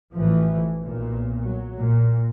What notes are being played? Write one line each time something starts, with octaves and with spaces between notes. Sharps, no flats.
A1 A2 E3 F3
B1 A#2
F#3
A#2